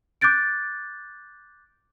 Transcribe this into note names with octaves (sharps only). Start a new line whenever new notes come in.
D6 F#6 G6 A6 D7